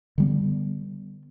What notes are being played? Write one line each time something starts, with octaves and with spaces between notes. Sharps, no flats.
D3 G3 B3